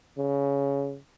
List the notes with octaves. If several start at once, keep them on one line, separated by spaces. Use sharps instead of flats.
C#3